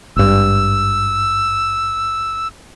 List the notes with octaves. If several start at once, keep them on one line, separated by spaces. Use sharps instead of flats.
G#1 G2 E6